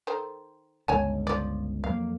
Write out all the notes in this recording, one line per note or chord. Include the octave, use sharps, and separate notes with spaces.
D#3 A4 C5
G1 C#2 C#5 G#5 A5
F3 D5
F2 F#3 A#3 F5